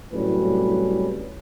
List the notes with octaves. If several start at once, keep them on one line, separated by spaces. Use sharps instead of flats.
C2 A2 F#3 G3 C#4 B4